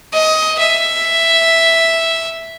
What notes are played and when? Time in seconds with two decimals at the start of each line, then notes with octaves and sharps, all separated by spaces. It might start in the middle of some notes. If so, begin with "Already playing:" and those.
0.13 D#5
0.59 E5